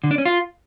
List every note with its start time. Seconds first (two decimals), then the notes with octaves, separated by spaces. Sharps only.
0.04 D3
0.11 D4
0.18 C#4
0.25 F4